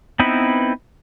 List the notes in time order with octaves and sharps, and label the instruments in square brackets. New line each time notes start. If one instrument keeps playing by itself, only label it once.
[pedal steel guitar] B3 C4 D#4 E4 B4